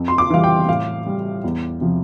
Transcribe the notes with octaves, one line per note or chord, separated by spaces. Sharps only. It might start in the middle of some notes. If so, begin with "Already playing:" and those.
Already playing: F2
C6
D6
E3 G3 F5
G5
A2 F5
G3
E2
C3 F3